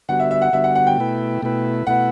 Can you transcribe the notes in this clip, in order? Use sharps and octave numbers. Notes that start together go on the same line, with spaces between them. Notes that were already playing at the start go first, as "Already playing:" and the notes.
D3 G3 B3 F#4 F#5
E5
E5
F#5
D3 G3 B3 F#4 E5
F#5
F#5
G5
B2 A3 E4 B4
B2 A3 E4 B4
B2 A3 E4 B4 F#5